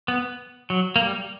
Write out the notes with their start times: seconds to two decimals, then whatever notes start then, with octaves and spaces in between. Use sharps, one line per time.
0.08 B3
0.70 F#3
0.96 A#3
1.02 G3